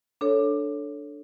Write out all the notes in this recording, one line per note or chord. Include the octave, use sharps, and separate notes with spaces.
D4 A4 C#5